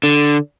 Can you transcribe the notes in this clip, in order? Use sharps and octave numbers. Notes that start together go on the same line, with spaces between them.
D3